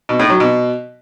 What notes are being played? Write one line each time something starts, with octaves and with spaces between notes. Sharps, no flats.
B2
A2
F#3
B2